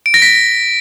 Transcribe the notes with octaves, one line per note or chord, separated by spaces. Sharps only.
D7
A#6
B6